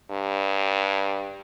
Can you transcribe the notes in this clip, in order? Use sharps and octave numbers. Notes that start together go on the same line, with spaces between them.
G2